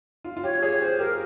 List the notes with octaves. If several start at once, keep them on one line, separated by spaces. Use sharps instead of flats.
F4
F4
G4 C#5
G#4 C#5
G4 C5
G4 A#4